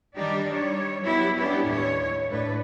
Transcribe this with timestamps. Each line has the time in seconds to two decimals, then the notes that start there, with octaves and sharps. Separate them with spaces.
0.16 D#3 G3 D4 D#4 G4
0.51 G3 C#5
1.02 F#3 B3 E4 G4
1.37 G3 B3 C#4 D4 E4 G4
1.67 D#2 A2 C#5
2.29 A2 D4 B4